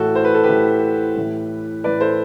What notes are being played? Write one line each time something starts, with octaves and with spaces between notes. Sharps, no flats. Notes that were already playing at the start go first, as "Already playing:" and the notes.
Already playing: A2 E3 F#4 A4
C5
B4
A4
G4 B4
A2 E3
A2 E3
A2 E3 B4 D5
A4 C5